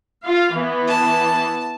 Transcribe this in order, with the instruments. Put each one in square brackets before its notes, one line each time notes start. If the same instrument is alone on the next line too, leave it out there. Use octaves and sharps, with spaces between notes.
[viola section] F4 F5
E3 B3
[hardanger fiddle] A5